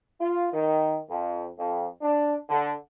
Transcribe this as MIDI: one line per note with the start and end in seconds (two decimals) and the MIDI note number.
0.21 0.48 65
0.53 0.97 51
1.10 1.47 41
1.59 1.86 41
2.02 2.35 62
2.49 2.73 50